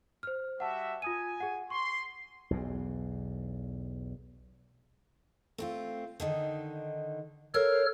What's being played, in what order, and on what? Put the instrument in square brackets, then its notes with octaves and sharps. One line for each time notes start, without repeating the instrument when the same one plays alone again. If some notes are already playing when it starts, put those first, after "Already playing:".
[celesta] C5 F6
[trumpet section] G3 F#4 E5 [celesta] F#5 A5
[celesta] F4 D#6 D#7 [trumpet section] G#5
[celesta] G#4 F#5
[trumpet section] C6 [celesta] C#6
[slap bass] B1 E2
[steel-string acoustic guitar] A3 C4 F4
D3 D#3 D#4
[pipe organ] A4 C#5 F6 [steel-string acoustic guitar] A#4 C5 F5